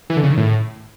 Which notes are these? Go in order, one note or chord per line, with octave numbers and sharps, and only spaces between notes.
E3
D3
C#3
D#3
A2